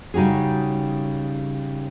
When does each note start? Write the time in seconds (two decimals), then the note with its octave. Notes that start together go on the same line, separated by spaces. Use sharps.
0.14 C#3 G3 D#4 F#4 G#4